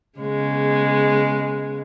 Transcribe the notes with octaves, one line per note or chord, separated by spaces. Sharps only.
C#3 G#3 B3